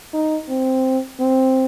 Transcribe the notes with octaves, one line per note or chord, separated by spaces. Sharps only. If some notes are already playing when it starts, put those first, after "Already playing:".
D#4
C4
C4